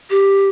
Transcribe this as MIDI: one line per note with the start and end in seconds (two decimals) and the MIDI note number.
0.10 0.49 67